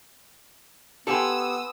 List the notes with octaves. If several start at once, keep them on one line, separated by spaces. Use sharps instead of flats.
B3 G4 A4 F#5 G#5 C6 D#6 E6